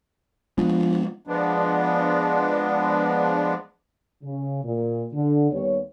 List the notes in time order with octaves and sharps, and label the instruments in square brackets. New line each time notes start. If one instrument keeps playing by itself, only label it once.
[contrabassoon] F3 [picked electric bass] G#3 B3 D4
[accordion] F3 G#3 B3 D4
[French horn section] C#3
A#2
D3
D#2 G3 B3 C#5